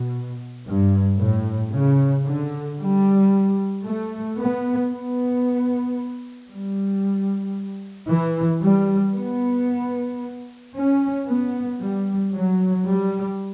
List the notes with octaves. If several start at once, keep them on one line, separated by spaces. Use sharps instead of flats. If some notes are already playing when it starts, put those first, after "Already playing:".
Already playing: B2
G2
A2
C#3
D3
G3
A3
B3
B3
G3
E3
G3
B3
C#4
B3
G3
F#3
G3